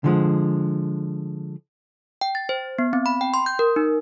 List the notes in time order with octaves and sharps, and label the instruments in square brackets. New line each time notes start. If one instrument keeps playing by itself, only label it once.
[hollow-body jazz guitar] D3 F3 G#3
[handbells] G5
A6
C5
B3
C4
B5
G5
C6
G6
A#4
D#4